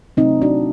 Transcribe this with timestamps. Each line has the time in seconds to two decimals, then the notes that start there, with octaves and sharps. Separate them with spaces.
0.17 C3 F#3 A3 C4 D#4
0.42 D4 F#4